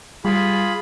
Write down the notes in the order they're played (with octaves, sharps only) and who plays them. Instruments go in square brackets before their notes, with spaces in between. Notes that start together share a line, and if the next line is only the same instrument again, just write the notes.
[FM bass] G3 [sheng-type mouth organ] F4 G#4 B5